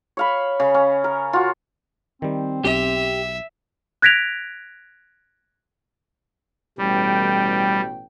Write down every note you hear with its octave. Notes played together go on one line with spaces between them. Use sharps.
C#5 F5 B5
C#3
C#4
A#4
F4 F#4
D#3 G3 C4
B1 G4 E5
F#6 G#6 A#6 B6 D7 F7
A1 B2 G3 G5